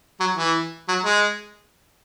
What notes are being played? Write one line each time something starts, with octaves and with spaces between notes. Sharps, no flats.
F#3
E3
F#3
G#3